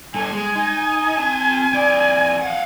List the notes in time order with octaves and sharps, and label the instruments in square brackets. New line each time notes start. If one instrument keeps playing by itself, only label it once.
[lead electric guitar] G2 A4 [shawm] G#5
[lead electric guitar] G#3
D#4
C4 A5
F2 D5
F5 F#5